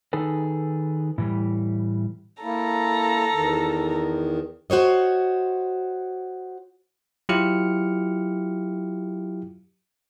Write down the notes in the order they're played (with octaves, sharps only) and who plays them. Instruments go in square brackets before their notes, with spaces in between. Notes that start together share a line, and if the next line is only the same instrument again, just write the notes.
[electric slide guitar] D#3 D#4 G#4 A4 B4
A2 E3 G3
[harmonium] A#3 E4 [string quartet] A4 A#5
[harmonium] E2 D#3
[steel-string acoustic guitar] F#4 C5 C#5 D#5
[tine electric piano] F#3 E4 F4 G4 F6 C#7